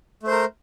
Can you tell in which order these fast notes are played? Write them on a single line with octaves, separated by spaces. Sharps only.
A3 C5 A#4